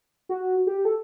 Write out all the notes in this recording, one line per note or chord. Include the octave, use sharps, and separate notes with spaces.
F#4
G4
A4